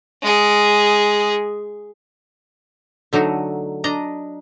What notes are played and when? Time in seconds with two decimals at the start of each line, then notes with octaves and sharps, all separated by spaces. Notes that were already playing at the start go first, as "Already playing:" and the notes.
0.22 G#3 G#4
3.13 D3 F#3 A3 D#4
3.84 D4 D#5 A#5